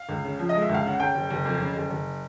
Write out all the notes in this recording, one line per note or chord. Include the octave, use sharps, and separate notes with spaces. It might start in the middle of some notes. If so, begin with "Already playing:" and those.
Already playing: F5
C#2
C#3
F3
D#5
G#3
E5
C#2
F5
C#3 F#5
C#3 G5
F#1
F#1
F2
C#3
F#1
F#1